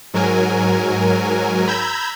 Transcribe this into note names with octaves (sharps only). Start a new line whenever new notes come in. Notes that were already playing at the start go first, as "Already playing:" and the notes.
G#2 F#3 A#4 G#5
A#5 B5 E6 G6 G#6